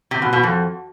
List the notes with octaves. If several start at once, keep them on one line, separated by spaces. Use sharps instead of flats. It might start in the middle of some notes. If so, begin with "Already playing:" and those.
C3
B2
B2
F2